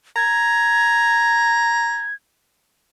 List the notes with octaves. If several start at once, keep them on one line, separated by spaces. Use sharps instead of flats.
A#5 G#6